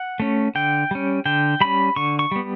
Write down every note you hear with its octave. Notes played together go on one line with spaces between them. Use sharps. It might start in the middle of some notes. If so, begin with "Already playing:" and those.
Already playing: F#5
A3 C#4
D3 G5
G3 C#4
D3 G5
G3 C#4 B5
D3 C#6
C#6
G3 B3